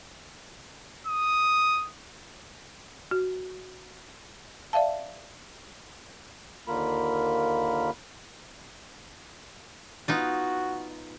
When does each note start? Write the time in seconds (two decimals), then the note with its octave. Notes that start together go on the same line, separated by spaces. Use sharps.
1.07 D#6
3.11 F#4
4.73 D5 E5 F5 A5
6.68 D#2 D3 A#3 F4 A#4 B5
10.08 B3 D#4 F4 F#4